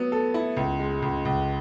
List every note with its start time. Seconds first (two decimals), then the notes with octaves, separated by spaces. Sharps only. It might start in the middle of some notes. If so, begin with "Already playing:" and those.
Already playing: F#3 B3
0.12 A4
0.34 E4
0.57 C#2
0.79 G#3
1.02 C#2
1.25 C#2